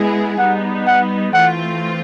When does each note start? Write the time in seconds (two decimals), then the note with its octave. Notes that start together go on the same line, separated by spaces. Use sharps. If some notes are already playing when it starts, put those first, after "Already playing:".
Already playing: G#3 B3 E4 G#4
0.38 G3 B3 D#4 F#5
0.87 F#5
1.34 E3 A3 C4 F4 F#5